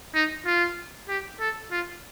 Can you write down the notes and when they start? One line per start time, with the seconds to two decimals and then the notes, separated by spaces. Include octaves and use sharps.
0.15 D#4
0.46 F4
1.08 G4
1.40 A4
1.71 F4